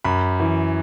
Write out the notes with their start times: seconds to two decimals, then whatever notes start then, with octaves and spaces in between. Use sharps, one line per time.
0.04 F#2 B5
0.40 E3